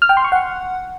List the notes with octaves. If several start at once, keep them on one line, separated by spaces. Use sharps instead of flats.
F6
G5
C6
C#6
F#5